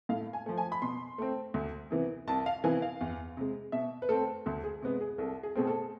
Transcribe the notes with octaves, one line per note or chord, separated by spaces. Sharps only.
A2 F5
G#5
F3 A3
G#5
B5
B2 C6
A3 C4
D2
C3 E3 B3
C2 A5
F5
C3 E3 B3 G#5
F5
E2
C3 G#3
B2 E5
B4
A3 C4 A4
D2 A4
G#4
C3 G#3 B3
G#4
C2 A4
G#4
B2 A3 C4 G#4
A4